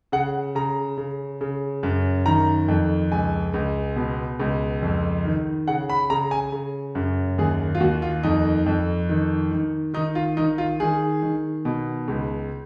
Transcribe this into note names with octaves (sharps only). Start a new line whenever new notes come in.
C#3 F#5
C#3 A#5
C#3
C#3
F#2
D#3 A#5
F2
C#2 G#5
C#2
B2
C#2
F2
D#3
C#3 F#5
B5
C#3 A#5
G#5
C#3
F#2
D#2 G#4
F4
D#2 F#4
F4
F2 D#4
F2
D#3
D#3
D#3 D#4
F4
D#3 D#4
F4
D#3 G#4
D#3
B2
C#2